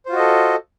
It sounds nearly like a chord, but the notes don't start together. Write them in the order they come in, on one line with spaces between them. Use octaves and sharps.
C5 F4 F#4 D#5 A4